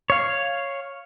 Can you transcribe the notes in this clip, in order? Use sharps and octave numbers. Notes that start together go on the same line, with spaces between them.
C#5 F5